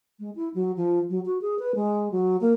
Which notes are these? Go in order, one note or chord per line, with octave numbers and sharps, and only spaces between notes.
G#3
E4
F#3
F3
F#3
F#4
G#4
B4
G#3
F#3
A#3